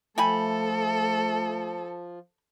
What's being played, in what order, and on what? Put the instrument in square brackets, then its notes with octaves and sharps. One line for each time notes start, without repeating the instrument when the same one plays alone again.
[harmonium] F3 [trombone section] A3 [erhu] A4 [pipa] G5 G#5 B5